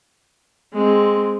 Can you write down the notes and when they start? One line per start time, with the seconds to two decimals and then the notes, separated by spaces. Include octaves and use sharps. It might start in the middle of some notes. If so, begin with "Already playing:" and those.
0.73 G#3 C4